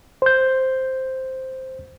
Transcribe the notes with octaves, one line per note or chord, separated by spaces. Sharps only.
C5 G6